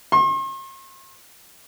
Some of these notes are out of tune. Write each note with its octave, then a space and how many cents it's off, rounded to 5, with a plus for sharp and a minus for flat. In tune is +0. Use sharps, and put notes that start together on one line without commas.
C6 +45